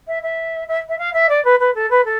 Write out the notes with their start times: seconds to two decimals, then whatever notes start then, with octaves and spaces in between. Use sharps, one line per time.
0.07 E5
0.22 E5
0.68 E5
0.88 E5
0.98 F5
1.13 E5
1.29 D5
1.44 B4
1.59 B4
1.74 A4
1.90 B4
2.05 A4